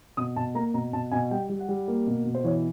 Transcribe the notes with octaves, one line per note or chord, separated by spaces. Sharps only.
B2 D#6
B2 A5
A#3 A#5
B2 A#5
B2 A5
B2 G#5
G3 G5
G3
F#5
G3
A#3
B2
B2
C5
E3 C#5